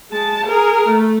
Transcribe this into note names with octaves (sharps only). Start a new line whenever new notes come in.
G#3 A5
G#4 A#4
A3